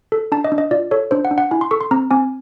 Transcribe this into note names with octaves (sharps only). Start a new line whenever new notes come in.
A4
D4 A5
D#5
D4
D#5
F4 D5
A4 C#5
D4 C5
F#5
D4
F#5
E4 G#5
C6
A4 C#6
C6
C4 A#5
C4 G#5